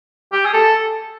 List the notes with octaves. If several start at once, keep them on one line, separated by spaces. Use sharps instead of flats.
G4
G#4
A4